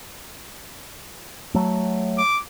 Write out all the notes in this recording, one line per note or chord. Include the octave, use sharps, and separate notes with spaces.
F#3 A3
D6